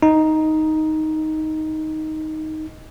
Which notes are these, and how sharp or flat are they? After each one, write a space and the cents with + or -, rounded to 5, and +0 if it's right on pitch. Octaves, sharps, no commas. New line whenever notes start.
D#4 +5